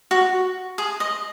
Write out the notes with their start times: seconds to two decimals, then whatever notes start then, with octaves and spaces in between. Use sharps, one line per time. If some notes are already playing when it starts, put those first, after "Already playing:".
0.11 F#4
0.78 G#4
1.00 D#5